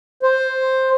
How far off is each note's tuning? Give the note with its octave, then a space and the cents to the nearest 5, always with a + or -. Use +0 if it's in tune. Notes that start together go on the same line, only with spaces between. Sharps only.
C5 +5